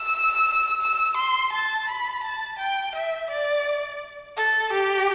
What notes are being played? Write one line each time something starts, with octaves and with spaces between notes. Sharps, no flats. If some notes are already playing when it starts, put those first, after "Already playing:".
Already playing: E6
E6
C6
A5
B5
A5
G5
E5
D5
A4
G4